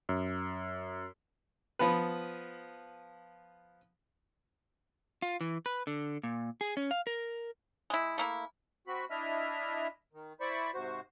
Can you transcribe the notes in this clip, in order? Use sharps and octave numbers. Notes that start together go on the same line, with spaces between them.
F#2
F3 B3 B4
F4
E3
B4
D3
A#2
G#4
C#4
F5
A#4
G#3 E4
A3 A#3 E4
C4 F#4 B5
D4 E4 D#5 E5 F6
D#3
E4 C5 D5 B5 C#6
G#2 C3 F#4 C5